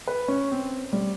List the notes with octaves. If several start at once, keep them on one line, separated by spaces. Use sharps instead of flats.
B4
C#4
C4
G3